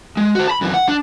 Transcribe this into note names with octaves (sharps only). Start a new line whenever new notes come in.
G#3
F#4 C5
A5 B5
F#2 E3
F#5
D4